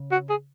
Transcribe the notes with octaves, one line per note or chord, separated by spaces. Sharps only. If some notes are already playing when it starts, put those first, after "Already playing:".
Already playing: C#3
F#4
G#4